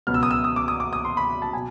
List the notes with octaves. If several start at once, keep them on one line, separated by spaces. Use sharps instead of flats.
C#2 B2 F#3 B3 F6
E6
D#6
E6
D#6
D6
D#6
D6
D#6
C6
B5
A5
B2 F#3 G#5